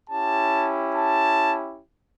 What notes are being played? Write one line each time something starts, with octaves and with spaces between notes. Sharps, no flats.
C#4 E4 G4 A5
A5